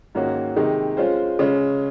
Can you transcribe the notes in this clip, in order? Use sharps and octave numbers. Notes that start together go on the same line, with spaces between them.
G#2 D#3 A#3 C#4 F#4
C3 D#3 G#3 D#4 G#4
G#3 C#4 F4 C5
C#3 G#3 C#4 G#4 C#5